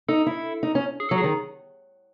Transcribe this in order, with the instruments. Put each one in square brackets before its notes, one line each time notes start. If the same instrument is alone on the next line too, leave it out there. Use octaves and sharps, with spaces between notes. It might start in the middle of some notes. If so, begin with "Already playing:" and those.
[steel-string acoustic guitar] D#4 [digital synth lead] A4
[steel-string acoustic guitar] E4
D#4
C#4
[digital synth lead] G#4
[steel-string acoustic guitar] F#3 [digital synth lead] A4
[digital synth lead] G#4
[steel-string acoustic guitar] D#3